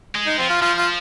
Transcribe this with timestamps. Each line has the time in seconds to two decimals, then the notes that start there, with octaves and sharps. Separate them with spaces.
0.15 G#3
0.26 D#4
0.38 F3 C4
0.50 F4
0.62 F3 F4
0.77 F4